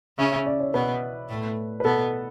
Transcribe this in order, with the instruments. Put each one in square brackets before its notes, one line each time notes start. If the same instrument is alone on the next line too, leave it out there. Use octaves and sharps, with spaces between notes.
[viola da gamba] C#3 C#4 [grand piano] E5
[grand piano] E5
D5
C#5
[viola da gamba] B2 B3 [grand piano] B4
[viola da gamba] A2 A3
[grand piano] B4
[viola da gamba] B2 B3 [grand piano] A4